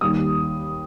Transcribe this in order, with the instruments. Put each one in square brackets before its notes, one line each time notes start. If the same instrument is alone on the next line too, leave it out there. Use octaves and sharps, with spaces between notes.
[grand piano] D#2 D#3 G3 D#6